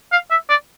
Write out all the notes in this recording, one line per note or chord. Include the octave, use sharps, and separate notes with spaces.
F5
E5
D5